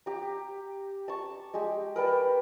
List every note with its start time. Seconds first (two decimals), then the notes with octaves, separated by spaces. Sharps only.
0.06 G4 A#5
1.08 A5 C#6
1.54 G#3 G4
1.96 A#4 B4 G5 A5